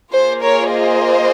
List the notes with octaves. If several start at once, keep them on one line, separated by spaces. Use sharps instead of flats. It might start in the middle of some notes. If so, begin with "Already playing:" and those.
A#3 F4 G#4 C5
A#4 C#5
C5 D#5